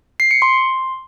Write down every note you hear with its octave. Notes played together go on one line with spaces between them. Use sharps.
C7
C#7
C6